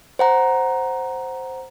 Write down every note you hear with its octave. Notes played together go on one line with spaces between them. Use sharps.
C5 F#5 A#5